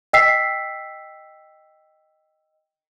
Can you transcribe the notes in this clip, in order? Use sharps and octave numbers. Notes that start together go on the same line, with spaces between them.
D#5 G5 E6 B6 C7